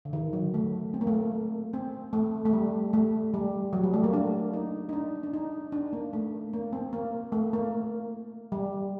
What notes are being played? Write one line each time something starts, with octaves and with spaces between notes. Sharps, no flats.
D3
D#3
F#3
A3
C4
A#3
A3
A#3
C4
A3
A3
G3
A3
G3
F#3
G3
A3
A#3
D4
D#4
D#4
D4
D4
D#4
D4
A#3
A3
A#3
C4
A#3
A3
A#3
G3